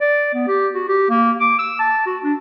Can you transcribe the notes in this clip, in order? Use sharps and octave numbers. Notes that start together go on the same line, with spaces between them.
D5
B3
G4
F#4
G4
A#3
D6
E6
A5
F#4
D4